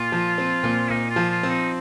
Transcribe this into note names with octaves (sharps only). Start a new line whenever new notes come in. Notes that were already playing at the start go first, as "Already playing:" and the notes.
Already playing: A#2 F4
F3
C4
A#2
A#2 D#4
F4
F3
F4
C4
D#4